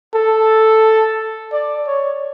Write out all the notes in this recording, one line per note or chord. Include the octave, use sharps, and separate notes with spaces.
A4
D5
C#5